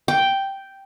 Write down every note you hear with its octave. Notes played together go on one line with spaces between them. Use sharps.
G5